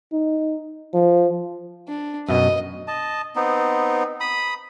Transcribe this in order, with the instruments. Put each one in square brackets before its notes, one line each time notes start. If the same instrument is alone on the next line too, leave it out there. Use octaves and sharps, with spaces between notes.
[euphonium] D#4
F3
[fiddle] D4
[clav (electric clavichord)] F#2 B2 [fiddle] D#5
[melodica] D#5 A5
B3 C4 D#4
B5 D#6